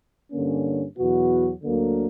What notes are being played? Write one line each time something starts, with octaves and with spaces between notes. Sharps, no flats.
G2 D3 A#3 C#4
E2 B2 F#3 B3 F#4
D2 D3 F#3 A#3